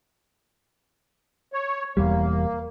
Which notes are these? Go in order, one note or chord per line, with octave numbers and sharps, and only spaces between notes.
C#5
E1 E2 G3 A#3